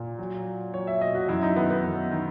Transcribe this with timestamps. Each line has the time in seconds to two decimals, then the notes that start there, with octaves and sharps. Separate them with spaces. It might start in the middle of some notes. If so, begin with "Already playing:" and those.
Already playing: A#2
0.19 F#3
0.46 F#3
0.74 F#3 C#5
0.87 E5
1.01 B2 D#5
1.15 F#4
1.28 F#2 E4
1.43 D#4
1.56 D#3 B3
1.70 B3
1.84 F#2
2.11 D#3